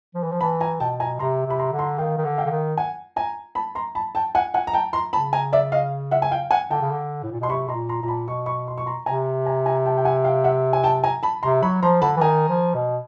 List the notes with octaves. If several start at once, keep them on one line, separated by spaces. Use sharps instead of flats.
F3
E3
F3
E3 A5 B5
G#5 A#5
B2 G5 A5
G#5 A#5
C3 A#5 C6
C3 B5
A#5 C6
D3
A#5 C6
D#3 F5 G5
D#3
D3
F5 G5
D3
D#3
F#5 G#5
G#5 A#5
A5 B5
A#5 C6
A5 B5
G5 A5
F#5 G#5
F#5 G#5
A#5
G5 A5
A#5 C6
C#3 A5 B5
G#5 A#5
D5 E5
D#5 F5
E5 F#5
G#5
F5 G5
F#5 G#5
D3 G5 A5
C#3
D3
A2
A#2
B2 C6
C3 B5 C#6
B2 A#5 C6
A#2
A#5 C6
A#2 A#5
A5 B5
B2 C#6
B5 C#6
C6
C#6
A#5 C6
C3 G#5 A#5
G#5 A#5
G#5 A#5
G5 A5
G5
F#5 G#5
F5 G5
E5 F#5
G#5
G5 A5
G#5 A#5
A5 B5
C3 A#5 C6
F#3 B5 C#6
F3 A#5 C6
D3 A5 B5
E3
D#3 G#5 A#5
F3
B2